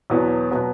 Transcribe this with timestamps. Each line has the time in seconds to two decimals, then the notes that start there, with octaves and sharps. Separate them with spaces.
0.10 E2 B2 F#3 B3
0.51 B2 F#3 B3